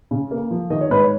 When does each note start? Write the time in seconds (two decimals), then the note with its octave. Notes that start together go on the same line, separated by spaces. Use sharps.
0.11 C#3
0.31 A#3
0.51 F3
0.70 D#3 D#5
0.81 C#5
0.90 G#2 B4
1.01 C#5